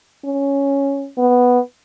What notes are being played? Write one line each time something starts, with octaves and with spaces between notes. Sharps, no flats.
C#4
B3